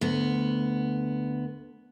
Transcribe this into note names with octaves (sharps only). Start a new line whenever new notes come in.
D2 B3